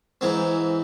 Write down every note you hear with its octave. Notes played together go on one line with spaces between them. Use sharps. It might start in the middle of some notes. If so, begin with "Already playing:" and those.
G#2 E3 G#3 C4